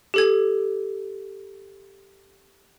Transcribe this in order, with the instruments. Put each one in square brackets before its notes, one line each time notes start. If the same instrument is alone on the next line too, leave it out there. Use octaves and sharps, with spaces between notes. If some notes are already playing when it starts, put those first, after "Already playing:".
[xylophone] G4 A4 G#6